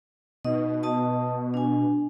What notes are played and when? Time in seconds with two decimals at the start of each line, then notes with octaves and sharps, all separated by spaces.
0.45 B2 D#4 D#5
0.83 D#5 A5 D#6
1.54 D4 G#5